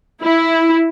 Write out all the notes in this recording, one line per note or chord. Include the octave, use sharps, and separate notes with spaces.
E4